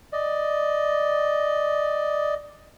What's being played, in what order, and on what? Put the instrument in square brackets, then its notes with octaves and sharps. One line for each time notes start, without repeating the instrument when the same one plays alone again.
[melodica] D5 D#5